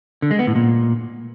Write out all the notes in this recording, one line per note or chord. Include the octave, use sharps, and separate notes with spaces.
D3
G#3
B3
A2
A#2